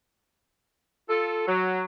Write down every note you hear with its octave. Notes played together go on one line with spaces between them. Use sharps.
F4 A4
F#3